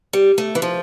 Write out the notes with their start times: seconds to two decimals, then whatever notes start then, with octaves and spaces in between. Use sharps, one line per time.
0.13 G3
0.38 A3
0.55 E3
0.62 F3